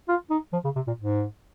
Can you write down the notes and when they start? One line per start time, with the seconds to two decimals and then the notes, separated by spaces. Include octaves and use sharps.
0.08 F4
0.30 D#4
0.53 F3
0.64 C#3
0.75 C3
0.87 A#2
0.98 G#2